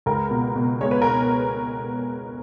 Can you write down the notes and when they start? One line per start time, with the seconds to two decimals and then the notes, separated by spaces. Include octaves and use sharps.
0.06 C#2 A#4
0.31 B2
0.56 B2
0.81 G#3 C#5
0.91 B4
1.02 B3 A#4